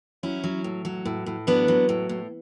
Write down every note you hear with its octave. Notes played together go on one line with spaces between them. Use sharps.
F#3 C#4 E4
F#3
A2
F#3
A2
A2
F#3 B3 D4
F#3
A2
A2